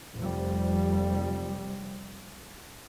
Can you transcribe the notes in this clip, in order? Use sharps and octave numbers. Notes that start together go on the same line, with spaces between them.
F1 F2 F3 G3